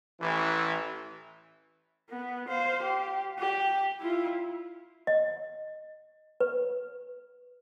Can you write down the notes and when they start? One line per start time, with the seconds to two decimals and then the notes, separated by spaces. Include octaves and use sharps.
0.19 A1 E3
2.09 B3
2.48 C5 F5
2.82 G4
3.39 G4
4.00 E4 F4
5.07 D#5
6.40 B4